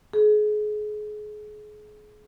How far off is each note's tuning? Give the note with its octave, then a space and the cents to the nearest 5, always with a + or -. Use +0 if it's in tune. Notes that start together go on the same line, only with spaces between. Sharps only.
G#4 +30